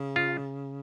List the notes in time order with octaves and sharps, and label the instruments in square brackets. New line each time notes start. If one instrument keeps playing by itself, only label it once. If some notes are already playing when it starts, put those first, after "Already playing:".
Already playing: [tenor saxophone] C#3
[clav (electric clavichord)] F4